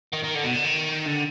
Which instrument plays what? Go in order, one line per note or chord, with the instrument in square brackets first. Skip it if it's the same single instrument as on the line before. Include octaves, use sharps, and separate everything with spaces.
[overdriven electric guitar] D#3
D#3
D3
B2
D3
D#3
D3